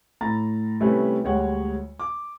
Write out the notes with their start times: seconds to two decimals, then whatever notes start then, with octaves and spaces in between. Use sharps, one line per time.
0.21 A2 A#5 A6
0.80 C3 G3 A3 C#4 E4 B4
1.24 D2 G3 G#3 C#5 F#5
2.00 D6